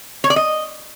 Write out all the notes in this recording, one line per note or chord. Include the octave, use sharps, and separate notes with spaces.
C#5
D5
D#5